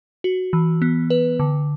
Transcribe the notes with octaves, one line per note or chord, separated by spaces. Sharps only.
F#4
E3
B3
B4
D3